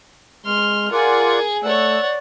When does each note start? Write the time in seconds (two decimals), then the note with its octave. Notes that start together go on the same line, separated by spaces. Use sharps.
0.45 G#3 C6 F6
0.92 F4 G#4 A#4 D5 F#5 G#5
1.63 A3 C#5 D5 F#5 E6